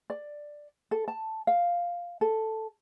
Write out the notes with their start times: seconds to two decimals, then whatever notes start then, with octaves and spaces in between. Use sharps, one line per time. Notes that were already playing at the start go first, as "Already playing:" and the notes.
0.10 D5
0.91 A4
1.08 A5
1.47 F5
2.21 A4